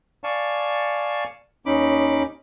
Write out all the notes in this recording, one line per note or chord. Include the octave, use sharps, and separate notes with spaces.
D5 F5 G#5 A5 C#6
D#2 C#4 D#4 B5 D6